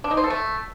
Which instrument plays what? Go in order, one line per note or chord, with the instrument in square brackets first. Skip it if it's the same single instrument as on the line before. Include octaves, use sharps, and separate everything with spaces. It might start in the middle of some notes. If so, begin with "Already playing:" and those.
[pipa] D4
D#4
C5
A4
A3